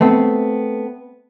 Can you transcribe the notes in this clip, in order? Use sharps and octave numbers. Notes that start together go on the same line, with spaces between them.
A3 B3 C4